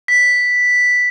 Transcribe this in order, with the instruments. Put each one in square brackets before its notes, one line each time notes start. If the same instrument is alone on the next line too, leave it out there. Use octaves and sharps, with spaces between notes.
[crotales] B6